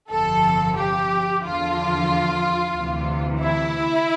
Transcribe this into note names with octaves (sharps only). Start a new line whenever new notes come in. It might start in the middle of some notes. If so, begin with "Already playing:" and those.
G1 F2 C3 F3 A4
G4
E2 D3 F3 F4
D2 C3 E3
E4